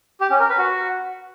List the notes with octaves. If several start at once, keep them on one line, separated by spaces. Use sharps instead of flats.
G4
C#4
A#4
B4
F#4